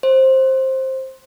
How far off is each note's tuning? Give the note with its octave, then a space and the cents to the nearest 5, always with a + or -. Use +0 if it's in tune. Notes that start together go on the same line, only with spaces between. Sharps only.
C5 +15